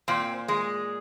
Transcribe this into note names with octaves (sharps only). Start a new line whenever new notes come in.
A#2 C4
G#3